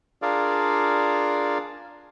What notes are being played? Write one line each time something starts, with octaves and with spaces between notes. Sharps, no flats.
D4 F4 G#4 A#4 D5 F5